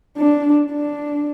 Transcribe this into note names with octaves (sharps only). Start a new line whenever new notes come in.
D4
D4